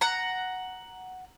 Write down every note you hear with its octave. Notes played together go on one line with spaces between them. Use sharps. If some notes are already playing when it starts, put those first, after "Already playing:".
F#5 A#5